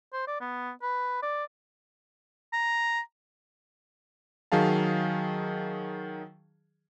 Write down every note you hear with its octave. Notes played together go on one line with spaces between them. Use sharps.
C5
D5
B3
B4
D5
A#5
D#3 F#3 G#4 F5 A5